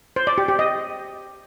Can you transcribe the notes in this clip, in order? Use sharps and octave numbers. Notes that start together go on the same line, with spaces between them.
C5
D5
G4
G4
D#5